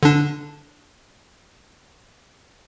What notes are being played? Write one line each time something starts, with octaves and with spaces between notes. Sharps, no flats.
D3 D4